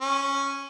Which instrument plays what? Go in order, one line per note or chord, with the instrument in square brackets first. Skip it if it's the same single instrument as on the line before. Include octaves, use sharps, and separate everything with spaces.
[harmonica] C#4